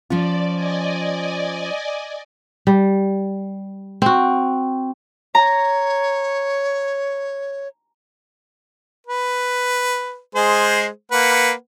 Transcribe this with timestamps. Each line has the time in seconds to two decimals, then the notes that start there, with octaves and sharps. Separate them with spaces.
0.10 F3 C#4 F4 D5
0.55 D5 D#5 G#5
2.67 G3
4.02 C4 F#4
5.35 C#5 A#5
9.07 B4
10.35 G#3 G#4 C5
11.11 A#3 B4 F#5